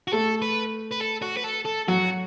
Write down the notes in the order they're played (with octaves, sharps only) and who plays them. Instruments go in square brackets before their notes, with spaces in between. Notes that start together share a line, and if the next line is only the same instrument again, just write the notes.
[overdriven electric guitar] F#4
[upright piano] A3 [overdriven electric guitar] A4
[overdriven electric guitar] B4
B4
A4
F#4
B4
A4
A4
[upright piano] F#3 [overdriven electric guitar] F#4